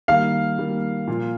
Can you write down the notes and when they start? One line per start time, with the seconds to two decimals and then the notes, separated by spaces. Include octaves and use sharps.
0.08 D#3 G3 A#3 F5
0.58 D#3 G3 A#3
1.07 A#2 F3 A#3 F4